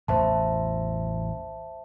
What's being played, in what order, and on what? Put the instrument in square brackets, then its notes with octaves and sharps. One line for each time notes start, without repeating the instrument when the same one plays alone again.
[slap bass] A1 E2 [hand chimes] C5 E5 A5